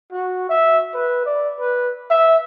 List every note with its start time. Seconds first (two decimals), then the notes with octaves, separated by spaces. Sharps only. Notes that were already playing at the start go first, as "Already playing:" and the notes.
0.12 F#4
0.50 E5
0.94 B4
1.26 D5
1.60 B4
2.11 E5